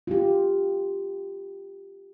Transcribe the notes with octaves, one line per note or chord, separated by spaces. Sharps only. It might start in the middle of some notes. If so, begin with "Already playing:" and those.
F4 G4